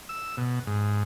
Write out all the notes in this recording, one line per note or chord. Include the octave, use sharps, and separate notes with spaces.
E6
B2
G#2